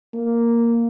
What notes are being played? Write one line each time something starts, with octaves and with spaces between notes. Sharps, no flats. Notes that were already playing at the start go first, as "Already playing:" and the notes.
A#3